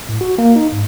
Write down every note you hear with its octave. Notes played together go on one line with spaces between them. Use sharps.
A2
F#4
A#3
D#4
G#2